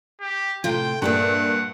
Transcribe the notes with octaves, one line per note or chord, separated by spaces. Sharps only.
G4
A2 C3 F4 G5
G2 A#2 G4 D5 E5 F#5